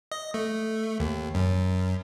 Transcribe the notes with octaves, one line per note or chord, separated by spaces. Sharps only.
D#5
A3
D#2
F#2